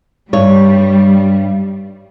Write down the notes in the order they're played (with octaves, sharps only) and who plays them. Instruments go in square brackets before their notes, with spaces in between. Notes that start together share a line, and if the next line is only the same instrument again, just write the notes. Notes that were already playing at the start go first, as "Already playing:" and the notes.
[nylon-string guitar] G2 C#5 [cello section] G3